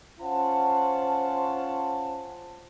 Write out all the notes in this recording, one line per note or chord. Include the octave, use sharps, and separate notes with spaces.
C#4 F4 C5 F#5 A5